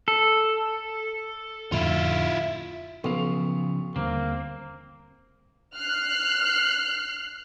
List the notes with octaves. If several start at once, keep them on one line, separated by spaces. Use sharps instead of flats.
A4
F2 A2 D3 E4 F4
B1 C#3 F3 F5
D#2 D3 G3 A#3 C4
F6 F#6 C7